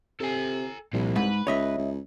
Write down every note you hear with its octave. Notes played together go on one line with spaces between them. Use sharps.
C3 A4 G#5
C2 A#2 F3
G#2 B4
C#2 C#5 D#5 E5
C#2